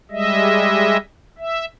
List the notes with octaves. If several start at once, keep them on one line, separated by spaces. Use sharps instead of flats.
G3 G#3 D#5 E5
E5